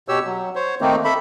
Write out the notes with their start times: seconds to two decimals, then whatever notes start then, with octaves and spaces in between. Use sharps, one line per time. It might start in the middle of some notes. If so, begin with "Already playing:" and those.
0.08 B2 G4 C#5 E6
0.26 F#3
0.55 C5 C#5
0.81 D#3 A3 A#3 C4 D#4
1.05 A4 E5 B5